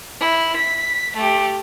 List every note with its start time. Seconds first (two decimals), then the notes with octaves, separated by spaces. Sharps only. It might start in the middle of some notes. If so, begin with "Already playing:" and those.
0.21 E4
0.56 B6
1.16 A3 G4